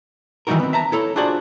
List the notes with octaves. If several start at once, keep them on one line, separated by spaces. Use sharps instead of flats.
D#3 E3 G3 D#4 F#4 A#4
B3 C4
E5 A5 A#5
E4 A4 C#5
D4 F4 F#4 G#4 C5 D5